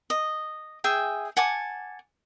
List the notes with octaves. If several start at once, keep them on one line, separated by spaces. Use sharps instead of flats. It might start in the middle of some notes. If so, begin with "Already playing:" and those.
D#5
G#4 E5 G5 G#5
F#5 G#5 A5 D6